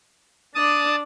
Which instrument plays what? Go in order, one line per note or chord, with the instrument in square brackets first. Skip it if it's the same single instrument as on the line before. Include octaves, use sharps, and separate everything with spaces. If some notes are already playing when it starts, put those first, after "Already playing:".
[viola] D4 D5 [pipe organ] A5 D#6